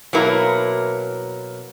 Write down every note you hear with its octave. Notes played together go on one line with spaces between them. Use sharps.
B2 F#3 A#3 E4 A#4